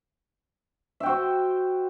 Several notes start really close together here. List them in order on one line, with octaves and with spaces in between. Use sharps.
E5 G5 F#4 C5